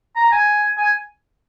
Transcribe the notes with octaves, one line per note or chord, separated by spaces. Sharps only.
A#5
G#5
G#5